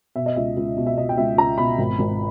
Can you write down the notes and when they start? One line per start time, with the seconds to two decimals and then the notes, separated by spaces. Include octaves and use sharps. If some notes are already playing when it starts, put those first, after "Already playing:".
0.16 B2 E5
0.26 D#5
0.36 C#2 E5
0.57 C#2
0.77 B2
0.86 E5
0.97 B2 D#5
1.09 G5
1.18 C#2 E5
1.38 C#2 A#5
1.58 B2 B5
1.78 G#1
1.99 G#1